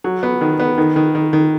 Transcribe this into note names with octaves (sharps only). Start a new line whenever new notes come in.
F#3
B3
D#3
B3
D#3
D#3
D#3
D#3